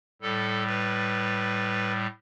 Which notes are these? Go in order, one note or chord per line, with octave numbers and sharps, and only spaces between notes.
A2 G3 A4
B4